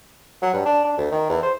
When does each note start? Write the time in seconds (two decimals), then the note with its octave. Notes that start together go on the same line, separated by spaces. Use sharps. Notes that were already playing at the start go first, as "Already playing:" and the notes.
0.42 F#3
0.53 G2
0.65 D4
0.85 D4
0.97 D2
1.11 D#3
1.30 E2
1.42 C5